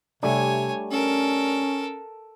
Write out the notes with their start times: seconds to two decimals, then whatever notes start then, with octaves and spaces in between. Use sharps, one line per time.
0.23 C3 G3 A3 D4 C#5 G#5
0.91 C#4 A4 A#4